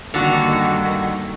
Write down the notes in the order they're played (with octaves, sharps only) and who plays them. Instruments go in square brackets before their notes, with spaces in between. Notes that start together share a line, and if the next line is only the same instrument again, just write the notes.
[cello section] G2 D#3 A#3 [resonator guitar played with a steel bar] D3 F#4